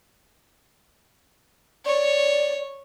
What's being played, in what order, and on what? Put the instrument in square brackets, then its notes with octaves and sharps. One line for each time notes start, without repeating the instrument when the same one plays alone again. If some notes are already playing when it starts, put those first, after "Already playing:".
[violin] C#5 [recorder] D5